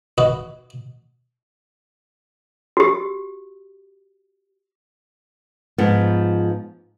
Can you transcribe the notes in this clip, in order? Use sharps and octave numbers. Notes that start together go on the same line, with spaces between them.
F#4 B4 D#5
F#4 G4
G#2 F3 B3